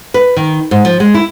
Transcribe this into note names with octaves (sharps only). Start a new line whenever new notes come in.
B4
D#3
G#2
F3
G#3
E4